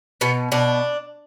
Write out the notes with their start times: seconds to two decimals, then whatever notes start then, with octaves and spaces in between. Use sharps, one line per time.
0.21 B2 B3
0.52 B2 D4